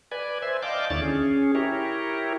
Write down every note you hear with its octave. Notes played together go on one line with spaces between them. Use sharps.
B4 D5 G#5
C5 E5 G#5
D5 D#5 F5 G5 A5 D6
D#2 D3 E4 C#5 D5 A6
C#4 G#4
E4 G4 A#4 C#5